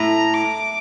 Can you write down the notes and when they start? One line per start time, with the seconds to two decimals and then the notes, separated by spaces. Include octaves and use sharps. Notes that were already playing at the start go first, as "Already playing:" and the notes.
Already playing: A2 A#5
0.34 D6